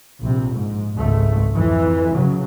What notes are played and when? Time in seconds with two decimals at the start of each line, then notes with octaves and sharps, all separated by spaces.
0.20 A#1 C3
0.54 G#2
0.96 G#1 C#2 G#2 A3
1.52 F2 E3
2.14 C#3 F#3